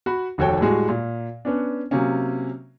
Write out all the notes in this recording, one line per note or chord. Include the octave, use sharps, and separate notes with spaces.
F#4 B5
F1 D#2 F#4 A4 C#5 G5
A2 G3 G#3 F#4 G#4
A#2
B3 C#4 D4
C3 F#3 A#3 C#4